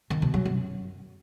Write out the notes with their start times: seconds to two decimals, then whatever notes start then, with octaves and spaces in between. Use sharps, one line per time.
0.10 D#3
0.22 B2
0.34 F#3
0.45 F#2